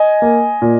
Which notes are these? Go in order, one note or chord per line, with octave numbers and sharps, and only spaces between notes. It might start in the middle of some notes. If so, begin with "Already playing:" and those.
Already playing: D#5 G#5
A#3
A#2